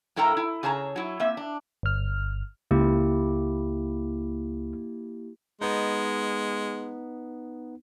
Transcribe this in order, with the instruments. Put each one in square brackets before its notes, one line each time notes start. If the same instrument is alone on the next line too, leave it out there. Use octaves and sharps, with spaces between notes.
[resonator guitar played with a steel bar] G2 E4 A4 A#4 G5 A#5
E4
C#3 G#4 C#5 A5 A#5
F#3 E4
A#3 C4 E5
D4
[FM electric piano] G1 F6
[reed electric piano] C#2 [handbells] A#3 E4 G4
[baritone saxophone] G#3 [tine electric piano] B3 D#4